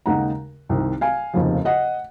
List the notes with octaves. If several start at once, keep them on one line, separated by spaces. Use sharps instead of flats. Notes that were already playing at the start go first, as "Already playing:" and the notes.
D#2 C#3 G#3 D#4 F#5 A#5
C2 C3 D#3
F5 G#5
F1 D#2 C#3 F3
D#5 F#5